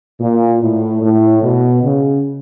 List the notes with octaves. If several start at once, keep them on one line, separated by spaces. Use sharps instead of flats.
A#2
A2
A2
B2
C#3